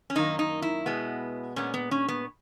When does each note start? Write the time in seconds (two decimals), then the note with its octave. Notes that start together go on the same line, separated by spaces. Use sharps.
0.10 C#4
0.15 F#2 D#3 A#3 D#4
0.39 D#4
0.62 E4
0.86 B2 G#3 B3
1.56 A#2 G#3 B3 C#4
1.74 B3
1.91 C#4
2.08 B3